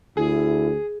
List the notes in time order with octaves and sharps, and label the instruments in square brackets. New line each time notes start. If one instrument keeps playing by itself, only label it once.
[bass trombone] D2 [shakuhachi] E4 [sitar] G#4